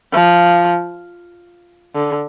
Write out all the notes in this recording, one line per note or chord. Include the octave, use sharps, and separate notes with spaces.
F3
D3